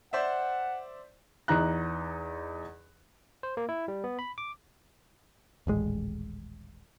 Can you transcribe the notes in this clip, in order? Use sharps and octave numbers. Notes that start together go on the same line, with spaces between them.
C5 D5 E5 F#5
E2 D#4 A#5 F#6
C5
A#3
E4
G3
B3
B5
D6
D#1 A1 G#3